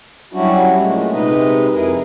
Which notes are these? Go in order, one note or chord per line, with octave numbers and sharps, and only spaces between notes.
F#3 G3 C#4 D4 E4 F#4
A#2 G#3 A3
C3 G#3 D#4 B4 D#5
F2 E4 G#4 A#4 B4